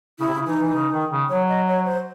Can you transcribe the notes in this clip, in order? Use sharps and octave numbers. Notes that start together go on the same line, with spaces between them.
C#3 E4
C3
C#3
E3 D#4
E3
C#3
D#3
C#3
F#3 C#5
D#5
C#5
C5